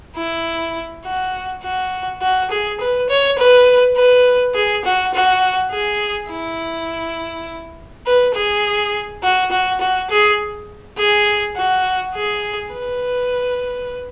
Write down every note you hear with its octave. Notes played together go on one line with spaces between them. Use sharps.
E4
F#4
F#4
F#4
G#4
B4
C#5
B4
B4
G#4
F#4
F#4
G#4
E4
B4
G#4
F#4
F#4
F#4
G#4
G#4
F#4
G#4
B4